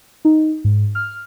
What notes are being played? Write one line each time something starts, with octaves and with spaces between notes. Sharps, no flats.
D#4
G#2
F6